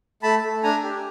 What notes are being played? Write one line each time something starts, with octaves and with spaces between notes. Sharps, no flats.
A3 A5 B5
A3
D4 G#5 A#5
G4